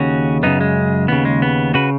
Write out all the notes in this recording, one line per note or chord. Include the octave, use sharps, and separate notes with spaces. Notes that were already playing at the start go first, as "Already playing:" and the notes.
Already playing: D#2 C#3 C#4 F#4
F#2 C#3 B3 D#4
G#3
D#2 C#3 B3
G#3
B3
C#3 F#4 B4